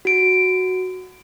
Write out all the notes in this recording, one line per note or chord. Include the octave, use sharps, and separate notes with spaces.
F#4 D7